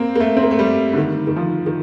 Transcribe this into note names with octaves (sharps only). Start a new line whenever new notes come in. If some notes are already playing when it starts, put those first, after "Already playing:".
Already playing: A#3 C4
A#3
A3
C4
A#3
A3
G3
D3
D#3
D#3
F3
D#3